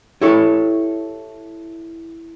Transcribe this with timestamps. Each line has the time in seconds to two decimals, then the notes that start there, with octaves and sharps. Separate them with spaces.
0.21 E4 G4 A4 C#5